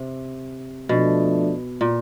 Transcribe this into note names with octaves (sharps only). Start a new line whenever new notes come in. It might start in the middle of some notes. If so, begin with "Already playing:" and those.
Already playing: C3
B2 F3 A3 D4
A#2